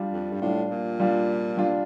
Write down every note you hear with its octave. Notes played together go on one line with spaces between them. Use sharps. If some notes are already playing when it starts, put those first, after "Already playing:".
Already playing: G3 D4 F4
F2
G2
A2 G3 D4 F4
A#2
G3 D4 F4
G3 D4 F4